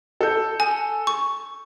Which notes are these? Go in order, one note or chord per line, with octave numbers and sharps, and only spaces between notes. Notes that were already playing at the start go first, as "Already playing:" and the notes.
A4 G6
G#5
C#6